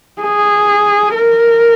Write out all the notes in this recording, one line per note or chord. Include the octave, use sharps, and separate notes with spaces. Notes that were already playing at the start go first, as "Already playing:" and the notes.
G#4
A#4